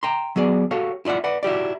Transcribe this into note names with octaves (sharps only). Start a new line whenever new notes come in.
G5 A#5 C6
F#3 B3 G#4 D5
F#4 G4 A4 C#5 F5
E4 F4 D5 E5 F#5
B4 D5 F#5
E4 F#4 G4 D5